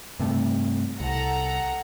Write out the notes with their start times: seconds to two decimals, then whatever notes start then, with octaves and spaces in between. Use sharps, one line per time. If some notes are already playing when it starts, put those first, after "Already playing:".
0.19 G2 C3 A3
1.00 C2 A4 F#5 A#5